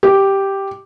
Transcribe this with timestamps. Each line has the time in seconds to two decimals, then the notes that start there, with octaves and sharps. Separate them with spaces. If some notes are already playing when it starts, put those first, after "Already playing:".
0.03 G4